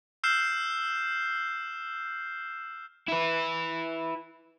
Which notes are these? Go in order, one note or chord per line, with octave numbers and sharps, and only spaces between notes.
E6 F6 G6 C7 E7
E4 B4